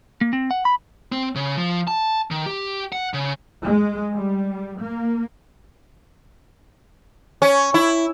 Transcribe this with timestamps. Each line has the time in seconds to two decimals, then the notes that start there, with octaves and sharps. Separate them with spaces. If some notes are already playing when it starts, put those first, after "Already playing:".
0.21 A#3
0.33 C4
0.51 F#5
0.65 B5
1.12 C4
1.35 C#3
1.58 F3
1.88 A5
2.31 D#3
2.46 G4
2.92 F#5
3.14 C#3
3.66 G#3
4.13 G3
4.79 A#3
7.42 C#4
7.74 E4